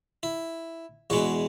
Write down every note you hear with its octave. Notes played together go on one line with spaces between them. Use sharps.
E4
E2 B2 G#3 F#4